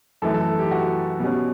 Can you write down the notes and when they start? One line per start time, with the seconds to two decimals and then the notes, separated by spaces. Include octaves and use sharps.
0.22 F#2 E3 A3 E4 A4
0.34 A4
0.59 G4
0.71 F#4
1.20 B2 G3 C#4